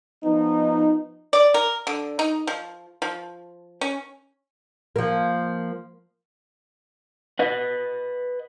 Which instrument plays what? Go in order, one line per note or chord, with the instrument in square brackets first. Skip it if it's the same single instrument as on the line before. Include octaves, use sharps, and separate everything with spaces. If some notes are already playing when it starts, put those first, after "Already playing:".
[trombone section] F3 B3 D#4
[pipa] D5
A#4
D3
D#4
F3
F3
C#4
[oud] F3 A#3
[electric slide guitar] B4 D#5 F#5